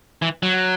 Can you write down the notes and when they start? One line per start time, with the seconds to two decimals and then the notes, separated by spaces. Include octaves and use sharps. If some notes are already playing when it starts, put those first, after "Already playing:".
0.22 E3
0.43 F#3